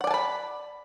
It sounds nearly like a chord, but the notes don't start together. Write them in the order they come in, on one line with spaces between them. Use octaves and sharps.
F#5 D5 G#5 A5 B5